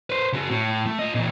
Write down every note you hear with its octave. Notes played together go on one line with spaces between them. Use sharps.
B4 C5
C#3 F#4
A2
A3
F4 D#5
A#2 E3